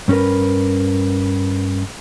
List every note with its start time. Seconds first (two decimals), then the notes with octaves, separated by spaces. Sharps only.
0.08 G2 C#4 D4 A#4 B4